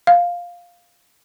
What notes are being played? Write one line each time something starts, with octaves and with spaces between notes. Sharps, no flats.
F5